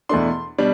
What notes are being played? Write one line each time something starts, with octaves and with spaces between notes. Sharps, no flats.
E2 B2 A3 D4 C6
B2 G3 D4